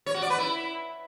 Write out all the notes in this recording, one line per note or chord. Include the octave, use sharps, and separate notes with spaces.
C#5
F#4
D5
B4
E4